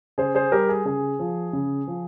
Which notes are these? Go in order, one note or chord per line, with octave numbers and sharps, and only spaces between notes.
C#3 G#4 C5
G#4 C5
G3 G4 A#4
G#4
C#3 G#4
F3
C#3
F3